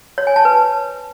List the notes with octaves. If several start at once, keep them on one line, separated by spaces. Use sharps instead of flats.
C#5
G#5
A5
B4